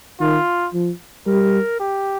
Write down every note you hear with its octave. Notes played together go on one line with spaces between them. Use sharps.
D#3 F4
F3
G3 A#4
G4